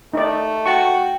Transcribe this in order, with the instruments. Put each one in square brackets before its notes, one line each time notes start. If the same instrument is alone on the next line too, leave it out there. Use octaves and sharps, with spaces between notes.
[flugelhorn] A3 [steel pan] D#4 D5
[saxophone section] F#4 [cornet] G5 [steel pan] A5 C#6